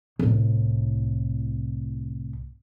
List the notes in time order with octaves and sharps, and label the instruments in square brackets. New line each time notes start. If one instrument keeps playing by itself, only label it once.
[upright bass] C2 A2